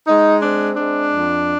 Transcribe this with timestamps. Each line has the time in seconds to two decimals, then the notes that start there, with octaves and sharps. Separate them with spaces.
0.07 G#3 D#4
0.42 C4 D4
0.77 G#3 D4
1.11 F2